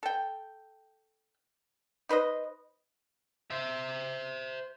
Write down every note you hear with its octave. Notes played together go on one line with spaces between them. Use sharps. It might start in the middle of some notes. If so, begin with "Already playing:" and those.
A4 G5
D#4 B4 C5 D#5
C5 E5